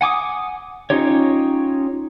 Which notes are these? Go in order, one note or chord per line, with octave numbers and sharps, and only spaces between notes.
F#5 G#5 D6 D#6
C#4 D#4 F4 G4 C#5